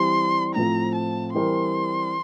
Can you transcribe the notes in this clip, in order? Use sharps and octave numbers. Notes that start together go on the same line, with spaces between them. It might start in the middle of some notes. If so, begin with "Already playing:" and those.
Already playing: E3 G3 C4 G4 C6
A2 F3 C4 A#5
A5
E3 G3 C4 G4 A#4 C6